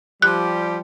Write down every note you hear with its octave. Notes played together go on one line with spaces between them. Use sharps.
F3 G3 G4 F#6